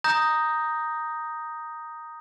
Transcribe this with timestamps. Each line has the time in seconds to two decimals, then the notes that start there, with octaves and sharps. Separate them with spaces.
0.04 A#5 D#6 G6 A#6